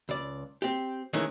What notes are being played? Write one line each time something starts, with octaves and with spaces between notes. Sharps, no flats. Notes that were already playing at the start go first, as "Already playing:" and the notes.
C#2 D5
C4 G4
D#3 E3 G#3 A3 C#4 D#4